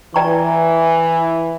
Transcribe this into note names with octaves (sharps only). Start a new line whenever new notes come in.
E3 B4 D5 G5 A#5 C#6